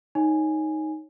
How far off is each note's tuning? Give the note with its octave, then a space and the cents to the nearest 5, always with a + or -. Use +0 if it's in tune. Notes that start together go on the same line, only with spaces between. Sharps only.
D#4 +0 C#5 +0 G#5 +0